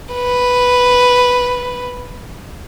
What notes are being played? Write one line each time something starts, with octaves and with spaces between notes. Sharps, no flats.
B4